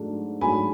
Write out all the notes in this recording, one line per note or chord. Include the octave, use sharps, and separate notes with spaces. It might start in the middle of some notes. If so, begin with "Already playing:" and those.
Already playing: G#2 F#3 A3 D4
G#2 F#3 A3 D4 G#5 B5